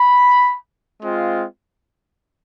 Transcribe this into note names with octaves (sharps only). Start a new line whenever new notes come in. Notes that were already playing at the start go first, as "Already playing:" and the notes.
Already playing: B5
G#3 C4 F4